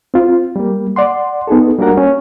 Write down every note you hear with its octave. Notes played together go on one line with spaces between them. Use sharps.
C4 F4
G3 A#3
D5 F#5 C6
B3 D#4 G#4 A4
G3 A#3 D4 F#4 A#4 F#5
C#4